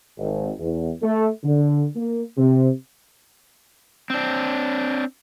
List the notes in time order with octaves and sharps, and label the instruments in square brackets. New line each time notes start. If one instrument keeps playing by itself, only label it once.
[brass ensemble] G#1
E2
A3
D3
A#3
C3
[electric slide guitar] C4 D4